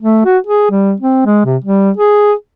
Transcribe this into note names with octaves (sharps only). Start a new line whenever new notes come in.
A3
F#4
G#4
G3
C4
G#3
C3
G3
G#4